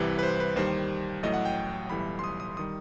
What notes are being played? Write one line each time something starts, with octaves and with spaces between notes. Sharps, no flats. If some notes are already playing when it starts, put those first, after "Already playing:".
Already playing: C2 C3 E3 G3 B4
B4
C5
B4
D#2 D#3 G3 C5
A1 A2 F#3 D#5
F#5
G5
B1 A2 E3 G3 B5
C6
D#6
D#6
D#3 G3 D#6